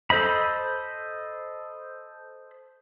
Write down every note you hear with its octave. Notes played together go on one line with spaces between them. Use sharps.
A4 C5 D#5 B5